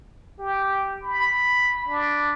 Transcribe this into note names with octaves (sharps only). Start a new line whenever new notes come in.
G4
B5
D4